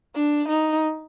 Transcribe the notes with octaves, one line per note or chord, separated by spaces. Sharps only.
D4
D#4